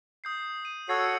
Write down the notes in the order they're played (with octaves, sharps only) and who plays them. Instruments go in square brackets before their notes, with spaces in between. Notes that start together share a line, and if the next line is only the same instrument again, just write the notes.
[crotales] D#6 G6 C7
D#7
[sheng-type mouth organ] F#4 A4 C#5 [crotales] E6 G#6 C7
[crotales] C#7